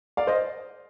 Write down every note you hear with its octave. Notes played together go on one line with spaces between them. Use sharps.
D5 F5
C5 D#5